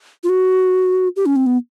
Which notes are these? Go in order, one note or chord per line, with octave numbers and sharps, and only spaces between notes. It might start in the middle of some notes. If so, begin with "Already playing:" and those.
F4
F#4
G4
C#4
C4
B3